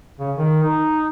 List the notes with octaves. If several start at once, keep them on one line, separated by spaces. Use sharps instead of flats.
C#3
D#3
D#4